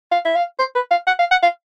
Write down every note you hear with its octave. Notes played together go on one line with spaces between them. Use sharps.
F5
E5
F5
C5
B4
F5
F#5
F5
F#5
F5